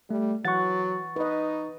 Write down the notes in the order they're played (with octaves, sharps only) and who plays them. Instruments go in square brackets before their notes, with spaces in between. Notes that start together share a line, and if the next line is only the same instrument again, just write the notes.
[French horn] G3 [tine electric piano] A3
[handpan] E3 F#5 [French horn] F#3 [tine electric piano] C#6 A6
[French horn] D#4 [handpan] B4 D#5